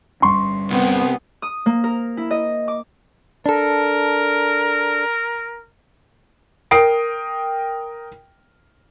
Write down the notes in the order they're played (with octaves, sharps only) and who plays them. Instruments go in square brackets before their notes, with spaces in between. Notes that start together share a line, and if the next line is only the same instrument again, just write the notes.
[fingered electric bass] G1 G3 C#4 [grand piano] C6 C#6
[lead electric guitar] C2 C3 [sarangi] B3
[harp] D#6
A#3
A#4
E4
D#5
D6
[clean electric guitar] D4 A4 [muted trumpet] A#4
[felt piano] A#4 G5 D#6 C7 D7